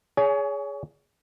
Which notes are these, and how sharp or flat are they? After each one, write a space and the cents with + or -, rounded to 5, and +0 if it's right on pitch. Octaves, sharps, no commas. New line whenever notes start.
G#4 +0 C#5 +30 G#5 +30